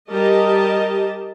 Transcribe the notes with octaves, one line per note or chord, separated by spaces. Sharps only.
G3 G4 A#4 D#5 A5